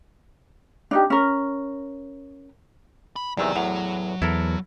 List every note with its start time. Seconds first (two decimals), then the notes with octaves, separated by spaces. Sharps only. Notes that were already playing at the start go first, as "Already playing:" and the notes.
0.91 D4 D#4 G4
1.10 C#4 A#4
3.16 B5
3.37 E2 C3 D#3 F#3 D5 G#5 A#5 E6
3.56 E2 A2 F#5 F7
4.22 E2 E4 A4 A#4